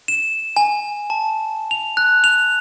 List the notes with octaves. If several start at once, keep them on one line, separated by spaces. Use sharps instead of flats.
E7
G#5
A5
F7
F#6
F7